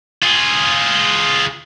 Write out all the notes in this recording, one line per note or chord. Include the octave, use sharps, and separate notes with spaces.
F4 G#4